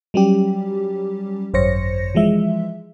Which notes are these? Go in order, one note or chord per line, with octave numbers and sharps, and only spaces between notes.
F#3 G3 C#4 G4
G#1 F#2 C5 C#5 A#6 C#7
E3 F3 G#3 E5